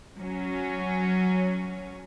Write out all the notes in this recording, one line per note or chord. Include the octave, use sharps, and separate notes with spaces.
F#3 C#4